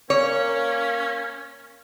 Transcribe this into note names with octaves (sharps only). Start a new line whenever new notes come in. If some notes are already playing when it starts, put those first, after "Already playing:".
A#3 C#4 C#5